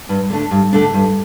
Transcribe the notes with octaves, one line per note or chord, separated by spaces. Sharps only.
G2
D3 A3 D4
G2
D3 A3 D4
G2